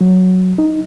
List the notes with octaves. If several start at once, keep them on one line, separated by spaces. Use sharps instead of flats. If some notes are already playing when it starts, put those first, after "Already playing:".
F#3
D#4